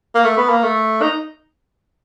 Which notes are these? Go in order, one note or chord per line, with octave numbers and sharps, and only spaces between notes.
A#3
A3
B3
A#3
A3
D#4